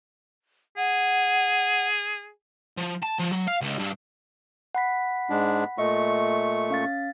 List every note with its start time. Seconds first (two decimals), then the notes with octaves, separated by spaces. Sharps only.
0.77 G#4 F#5
2.78 F3
3.03 A5
3.20 F3
3.32 F#3
3.48 F5
3.61 C#2
3.79 G2
4.75 F#5 B5 B6
5.30 G#2 G#3 D4
5.78 A#2 A3 D#5 E5 C#6
6.70 C#4 F5 A6